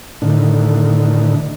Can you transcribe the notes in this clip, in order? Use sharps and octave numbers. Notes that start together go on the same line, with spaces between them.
A2 D3 D#3